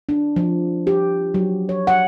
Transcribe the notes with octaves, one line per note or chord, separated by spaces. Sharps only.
D4
F3
G4
F#3
C#5
F#5